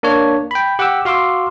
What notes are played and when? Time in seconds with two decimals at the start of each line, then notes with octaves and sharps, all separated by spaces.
0.03 A#3 D4 A#4 C#5
0.51 G5 B5
0.79 G4 F#5 G5 D6 E6
1.05 F#4 F5 C6 D6 E6